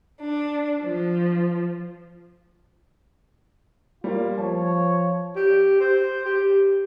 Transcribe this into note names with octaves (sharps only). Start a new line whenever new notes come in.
D4
F3
G3 A#3 F4
F3 C#5 A5
G4
C5
G4